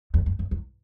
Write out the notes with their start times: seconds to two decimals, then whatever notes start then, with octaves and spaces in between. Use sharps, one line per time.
0.14 E2
0.26 F2
0.39 F2
0.51 E2